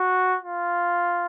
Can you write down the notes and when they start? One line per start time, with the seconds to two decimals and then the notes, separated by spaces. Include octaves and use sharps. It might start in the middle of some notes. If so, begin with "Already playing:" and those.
Already playing: F#4
0.43 F4